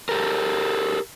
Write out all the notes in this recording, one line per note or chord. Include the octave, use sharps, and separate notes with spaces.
G4 A4 A#4